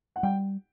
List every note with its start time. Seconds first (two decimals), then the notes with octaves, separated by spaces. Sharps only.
0.16 F#5
0.23 G3 G5